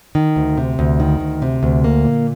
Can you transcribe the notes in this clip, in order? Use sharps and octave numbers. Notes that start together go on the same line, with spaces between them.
D#3
D2
C3
D2
D#3
D2
C3
D2
A#3
A#2